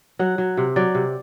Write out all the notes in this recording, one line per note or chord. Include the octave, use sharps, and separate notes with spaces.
F#3 F#5
F#3
C3
F#3 D5
C3